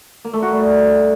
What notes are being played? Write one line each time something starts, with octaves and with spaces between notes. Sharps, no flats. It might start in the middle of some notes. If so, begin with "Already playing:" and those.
A#3
A3
F#4
G3